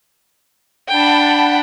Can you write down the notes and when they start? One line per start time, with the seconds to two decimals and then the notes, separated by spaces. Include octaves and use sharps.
0.88 D4 F#5 G5 A5 B5